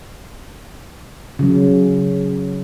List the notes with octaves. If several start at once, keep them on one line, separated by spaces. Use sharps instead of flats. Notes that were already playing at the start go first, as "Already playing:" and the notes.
C#3 F#3